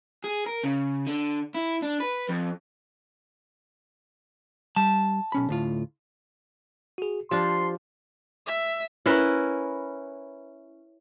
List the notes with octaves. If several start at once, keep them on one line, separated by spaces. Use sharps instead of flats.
G#4
A#4
C#3
D3
E4
D4
B4
F2
G3 A5
B1 C#4 B5
D2 A2 F4
F#4 G#4
F3 D4 G4 C5 C6
E5
C#4 E4 A#4 B4